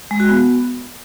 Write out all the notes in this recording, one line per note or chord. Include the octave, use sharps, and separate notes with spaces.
G#3
F#4
B3